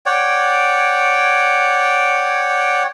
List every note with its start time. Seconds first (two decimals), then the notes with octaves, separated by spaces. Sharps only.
0.06 C#5 D5 F#5 G5